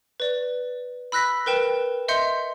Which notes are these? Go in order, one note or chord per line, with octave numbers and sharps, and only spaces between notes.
B4 D5
B5 E6 F#6 A#6 B6
A#4 B4 G5 E7
D#5 E5 C6 G6 C#7